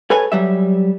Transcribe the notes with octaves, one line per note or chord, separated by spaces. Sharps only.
G#4 A4 B4 C#5 G#5
F#3 G3 E5